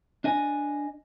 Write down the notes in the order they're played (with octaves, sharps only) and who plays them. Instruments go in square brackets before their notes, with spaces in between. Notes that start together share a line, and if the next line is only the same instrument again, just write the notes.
[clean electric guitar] D4 D#5 G#5